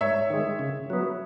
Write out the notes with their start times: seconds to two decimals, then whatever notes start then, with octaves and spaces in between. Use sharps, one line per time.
0.01 G#2 C#5 E5
0.30 D#3 G#3
0.59 C#3
0.90 F#3 B3